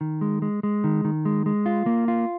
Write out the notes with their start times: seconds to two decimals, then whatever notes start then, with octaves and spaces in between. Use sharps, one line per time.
0.01 D#3
0.21 G#3
0.42 G#3
0.63 G#3
0.84 D#3
1.05 D#3
1.25 G#3
1.46 G#3
1.66 F4
1.86 A#3
2.08 F4